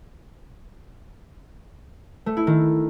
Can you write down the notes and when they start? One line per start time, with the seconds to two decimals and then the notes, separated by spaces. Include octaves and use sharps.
2.26 A3
2.37 E4
2.47 D#3